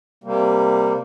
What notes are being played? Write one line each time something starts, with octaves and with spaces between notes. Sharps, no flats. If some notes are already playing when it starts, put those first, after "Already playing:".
C3 G3 A#3